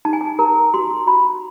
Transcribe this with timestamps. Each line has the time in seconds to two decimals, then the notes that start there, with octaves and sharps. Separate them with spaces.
0.05 D#4 A5
0.13 G#5
0.21 A5
0.39 A#4 A#5
0.74 F#4 C6
1.07 F#4 B5